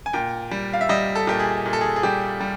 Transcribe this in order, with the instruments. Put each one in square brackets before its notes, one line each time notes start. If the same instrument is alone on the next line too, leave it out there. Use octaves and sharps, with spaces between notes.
[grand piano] G#5
A#2 G5
G3
F5
E5
G3 D#5
A4
A#2 G4
G#4
A#2 G#4
A4
G#4
G#4
G3 G4
G3